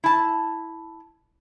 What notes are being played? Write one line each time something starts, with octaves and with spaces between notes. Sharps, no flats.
E4 A5